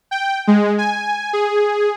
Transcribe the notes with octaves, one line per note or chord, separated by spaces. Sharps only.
G5
G#3
G#5
G#4